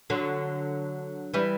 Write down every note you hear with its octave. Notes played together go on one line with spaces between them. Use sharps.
D3 F#3
E3 G3